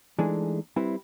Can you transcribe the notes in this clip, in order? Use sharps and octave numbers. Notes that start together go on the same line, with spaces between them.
E3 G#3 A3 D4 D#4
G3 C4 E4 B4